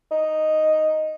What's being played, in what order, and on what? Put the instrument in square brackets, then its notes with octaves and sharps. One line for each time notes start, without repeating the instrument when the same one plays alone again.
[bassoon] D#4